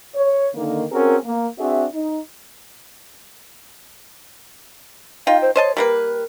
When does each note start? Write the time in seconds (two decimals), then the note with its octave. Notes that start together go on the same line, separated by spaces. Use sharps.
0.16 C#5
0.55 D3 D#3 A#3
0.91 C4 C#4 F#4 G#4 A#4
1.25 A#3
1.59 C4 D4 F#4 G#4 E5
1.94 D#4
5.27 D#4 F4 F5 G5
5.42 C5
5.56 C5 C#5 D#5 A5
5.77 G3 A#3 A#4 B4